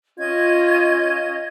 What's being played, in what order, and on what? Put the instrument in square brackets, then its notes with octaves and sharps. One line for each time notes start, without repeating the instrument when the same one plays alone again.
[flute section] C#4 D#5 G#6 [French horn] F4